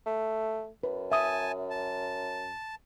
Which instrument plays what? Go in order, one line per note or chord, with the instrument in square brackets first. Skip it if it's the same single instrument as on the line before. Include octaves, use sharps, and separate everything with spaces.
[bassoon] A3
[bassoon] F#2 [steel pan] B4
[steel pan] E5 D#6 [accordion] G#5 A5
[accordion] A5